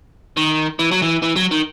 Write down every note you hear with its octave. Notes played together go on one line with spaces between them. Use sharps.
D#3
E3
F#3
E3
E3
F#3
D#3